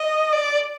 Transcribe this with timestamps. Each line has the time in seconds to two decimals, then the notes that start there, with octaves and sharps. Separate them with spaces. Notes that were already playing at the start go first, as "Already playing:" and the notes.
Already playing: D#5
0.33 D5